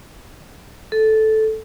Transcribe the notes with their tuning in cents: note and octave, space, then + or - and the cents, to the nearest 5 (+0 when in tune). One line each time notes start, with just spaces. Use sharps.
A4 -10